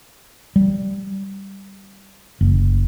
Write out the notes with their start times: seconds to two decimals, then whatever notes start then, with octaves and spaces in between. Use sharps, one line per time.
0.56 G3
2.41 F#1